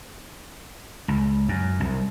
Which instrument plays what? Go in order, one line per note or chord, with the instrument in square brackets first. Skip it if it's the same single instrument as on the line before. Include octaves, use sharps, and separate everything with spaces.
[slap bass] C#2
F#2
C2